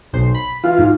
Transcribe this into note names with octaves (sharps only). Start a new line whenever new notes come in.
B1 C5 C7
B5
E3 F4
G#2